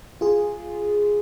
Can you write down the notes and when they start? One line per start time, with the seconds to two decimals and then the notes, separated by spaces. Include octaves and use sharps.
0.21 F4 G#4